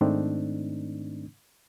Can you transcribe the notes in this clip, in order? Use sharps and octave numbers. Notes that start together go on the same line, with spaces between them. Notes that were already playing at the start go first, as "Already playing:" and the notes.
G#2 D#3 A3 C4 D4 D#4